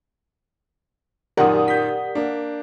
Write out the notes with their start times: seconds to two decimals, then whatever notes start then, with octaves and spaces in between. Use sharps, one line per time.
1.37 F#2 A#2 D#3 G4 A#4 D5 F#5 D#6
1.68 G6 B6
2.15 A#3 D4